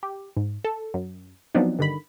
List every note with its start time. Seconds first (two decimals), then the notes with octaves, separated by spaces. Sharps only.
0.03 G4
0.37 G#2
0.65 A4
0.94 F#2
1.55 F3 F#3 B3 C4 D4 D#4
1.79 G2 D3 D#3 B5